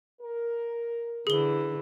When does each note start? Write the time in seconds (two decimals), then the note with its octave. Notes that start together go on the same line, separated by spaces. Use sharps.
0.21 A#4
1.27 D3 E3 G#4 G7